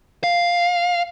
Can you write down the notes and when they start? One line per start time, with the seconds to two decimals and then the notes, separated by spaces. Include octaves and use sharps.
0.24 F5